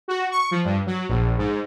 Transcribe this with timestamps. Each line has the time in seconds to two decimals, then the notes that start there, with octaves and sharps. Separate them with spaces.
0.08 F#4
0.31 C#6
0.51 F3
0.65 G2
0.86 F#3
1.09 A#1
1.38 G#2